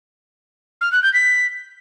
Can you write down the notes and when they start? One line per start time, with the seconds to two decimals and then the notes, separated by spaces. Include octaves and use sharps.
0.81 F6
0.92 F#6
1.03 G6
1.13 B6